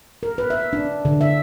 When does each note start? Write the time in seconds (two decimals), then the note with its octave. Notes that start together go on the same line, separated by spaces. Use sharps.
0.23 A#4
0.38 B4
0.50 E5
0.73 D4
1.05 D3
1.21 E5